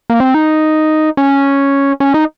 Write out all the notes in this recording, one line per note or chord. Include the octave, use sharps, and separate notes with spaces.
A#3
C4
D#4
C#4
C#4
D#4